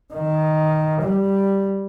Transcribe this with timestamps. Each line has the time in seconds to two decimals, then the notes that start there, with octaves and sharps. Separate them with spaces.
0.14 D#3
1.02 G3